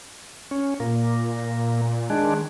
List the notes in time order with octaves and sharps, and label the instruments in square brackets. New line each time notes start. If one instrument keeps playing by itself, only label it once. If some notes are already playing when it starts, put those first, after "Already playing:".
[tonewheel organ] C#4
[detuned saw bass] A#2 [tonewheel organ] A#3
[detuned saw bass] D#3 [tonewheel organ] G#3 D4